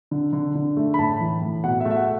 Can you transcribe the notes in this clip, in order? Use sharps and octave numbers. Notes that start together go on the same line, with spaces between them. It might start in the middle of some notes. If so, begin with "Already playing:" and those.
D3
D3
D3
A3
B5
A2 A5
E3
A2
B2 F#5
E5
A3
E5
F#5